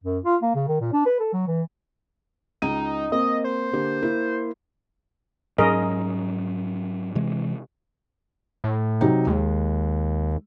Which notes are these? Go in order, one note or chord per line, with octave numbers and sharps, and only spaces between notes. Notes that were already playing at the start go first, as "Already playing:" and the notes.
F#2
F4
A#3
C#3
D#3
A#2
D4
B4
A4
F#3
E3
C#2 D#4 D#7
A#3 C4 D#5
C5
D3 A#3 G4
A#3 E4
G#2 F#3 C#4 G#4 A#4 D#5
C3 E3 G#3
A2
C3 F#3 D#4
D#2 G#3